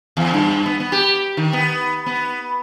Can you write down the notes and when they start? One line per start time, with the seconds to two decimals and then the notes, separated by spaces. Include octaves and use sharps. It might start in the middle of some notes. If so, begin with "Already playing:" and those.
0.17 E2
0.34 G2
0.66 B3
0.80 B3
0.92 G4
1.37 D#3
1.53 B3
2.06 B3